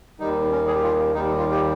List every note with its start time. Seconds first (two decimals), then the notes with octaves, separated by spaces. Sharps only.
0.20 D#2 D#3 G3 D#4
0.51 C#4
0.67 G#4
0.75 G4
0.83 F4
1.14 D#2 D#3 G3 D#4
1.38 F4
1.51 G4